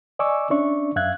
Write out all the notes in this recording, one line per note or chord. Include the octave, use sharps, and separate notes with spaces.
D5 D#5 G#5 C#6 D6 E6
C#4 D4 D5 E5 C#6
F#2 E5 F5 F#6 G#6